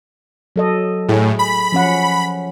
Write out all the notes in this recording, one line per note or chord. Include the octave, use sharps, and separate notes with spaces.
F#3 A4 D#5
A2 G#4
B5
F3 C#4 F#5